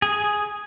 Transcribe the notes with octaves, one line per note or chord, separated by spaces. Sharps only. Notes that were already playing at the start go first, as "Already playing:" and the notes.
G#4